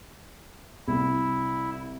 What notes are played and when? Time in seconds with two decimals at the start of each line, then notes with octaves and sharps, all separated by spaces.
0.88 C2 E4